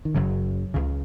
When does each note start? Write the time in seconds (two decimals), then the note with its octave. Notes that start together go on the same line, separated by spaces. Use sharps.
0.05 D#3
0.15 F#1 F#2 C#3 F#3
0.74 C#2 C#3